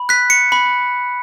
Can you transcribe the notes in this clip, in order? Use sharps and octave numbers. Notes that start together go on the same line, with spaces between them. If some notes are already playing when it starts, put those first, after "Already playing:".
Already playing: B5
F#6 B6
C#7
B5